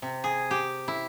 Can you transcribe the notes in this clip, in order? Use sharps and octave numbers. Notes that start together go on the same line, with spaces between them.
C3
G#4
G4
E4